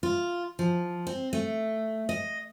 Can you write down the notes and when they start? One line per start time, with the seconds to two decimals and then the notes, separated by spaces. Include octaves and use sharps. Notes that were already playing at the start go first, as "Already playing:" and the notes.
0.03 F4
0.59 F3
1.07 C4
1.33 A3
2.09 D#5